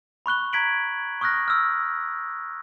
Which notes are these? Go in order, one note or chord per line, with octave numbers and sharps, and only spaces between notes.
B5 C#6 F#6 G7
A#5 G#6 B6 D7 F#7
C#6 D#6 F6 F#6 A#6
E6 F6